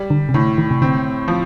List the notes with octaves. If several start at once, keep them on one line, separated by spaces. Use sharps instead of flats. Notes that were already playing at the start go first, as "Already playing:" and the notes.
Already playing: G3
D3
C3
A2 D3
D#3
C3
D3 C4
F3